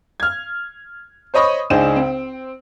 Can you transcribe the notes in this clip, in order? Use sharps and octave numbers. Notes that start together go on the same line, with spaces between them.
F6 G#6
C5 C#5 D#5 B5 C#6 D#6
C#2 D4 D#4 G#4 C5 E7
C4